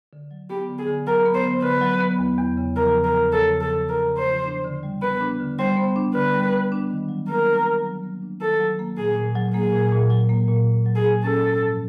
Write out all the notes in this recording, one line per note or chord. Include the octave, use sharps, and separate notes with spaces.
D3
F#3
B3 G4
D3
G#4
D3
F#3 A#4
B3
C5
D3
D3 B4
F#3
B3
E2
E2
C#3
F3 A#4
E2
A#4
E2
C#3 A4
F3
A4
E2
E2 A#4
C#3
C5
F3
D4
D3
G3
B3 B4
D4
D3
G3 C5
B3
D4
D3 B4
G3
B3
D4
D#3
F#3
A#3 A#4
D4
D#3
F#3
A#3
D4
D#3 A4
F#3
A#3
A#2 G#4
A#2
F#3
A#3 G#4
A#2
A#2
F#3
A#3
A#2
A#2
F#3
G#4
A#3
C#4 A4
G#2
F3